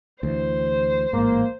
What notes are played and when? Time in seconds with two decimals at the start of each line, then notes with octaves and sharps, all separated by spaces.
0.23 D2 E3 C5
1.13 A1 G#2 A#3